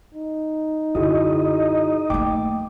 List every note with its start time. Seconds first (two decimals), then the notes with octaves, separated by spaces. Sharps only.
0.15 D#4
0.95 F#2 D3 E4 F#4 G#4 D#5
2.10 A3 A#3 G5 D6